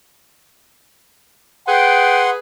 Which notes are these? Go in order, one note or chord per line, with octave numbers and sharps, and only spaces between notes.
G#4 B4 F#5 G5 C6